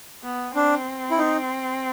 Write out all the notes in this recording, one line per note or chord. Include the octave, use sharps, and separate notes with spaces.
B3
C4 D4
E4
D#4